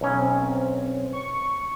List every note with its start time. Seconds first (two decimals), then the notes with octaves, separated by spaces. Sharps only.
0.01 B1 C#4
0.19 C4
1.13 C#6